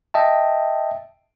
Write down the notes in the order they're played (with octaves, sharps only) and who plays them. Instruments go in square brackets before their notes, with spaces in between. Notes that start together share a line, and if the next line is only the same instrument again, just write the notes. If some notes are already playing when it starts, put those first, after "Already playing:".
[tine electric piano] D#5 E5 G5 A5